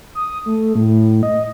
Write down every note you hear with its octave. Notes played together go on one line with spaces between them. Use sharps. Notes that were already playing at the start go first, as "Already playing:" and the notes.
D#6
A3
A2
D#5